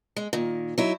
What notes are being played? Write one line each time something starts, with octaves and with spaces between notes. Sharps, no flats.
G#3
A#2 D#3
F#3 D#4 E4